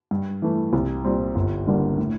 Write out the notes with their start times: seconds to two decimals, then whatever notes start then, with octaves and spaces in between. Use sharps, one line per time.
0.11 G2
0.42 E3 A3
0.73 C2
1.04 A#2 G3 C4
1.35 G1
1.67 G2 D3 G3 A#3
1.98 A2